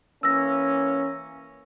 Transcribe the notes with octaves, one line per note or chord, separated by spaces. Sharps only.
E3 A#3 C#4 E6 A#6